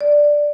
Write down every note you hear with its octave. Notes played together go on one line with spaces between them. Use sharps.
D5